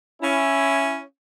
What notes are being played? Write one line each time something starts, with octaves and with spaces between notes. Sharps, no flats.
C#4 E4